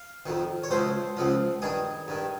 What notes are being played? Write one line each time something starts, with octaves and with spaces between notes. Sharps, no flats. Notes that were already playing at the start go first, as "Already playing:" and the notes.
Already playing: F5
F2 D#3
C#5
C#2 C#3 F3 C5
C#2 C#3 F3
G2 D#3 G#4
G2 D#3